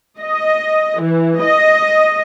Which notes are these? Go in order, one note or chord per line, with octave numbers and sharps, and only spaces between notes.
D#5
E3
D#5